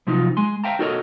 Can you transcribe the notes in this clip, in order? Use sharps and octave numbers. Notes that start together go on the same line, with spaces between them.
C3 F3 F#3 D#4 F4
G#3 G#5 C6
C5 E5 F5 G5 A5 A#5
D#4 F#4 A4 A#4 C#5 D#5